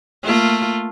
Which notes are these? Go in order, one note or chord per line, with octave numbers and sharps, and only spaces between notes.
A3 A#3 F4